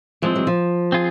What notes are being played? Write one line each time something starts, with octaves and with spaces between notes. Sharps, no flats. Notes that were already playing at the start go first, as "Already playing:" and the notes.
E3 F3 G#3 C4
F#3
F3
C4 F4 G#4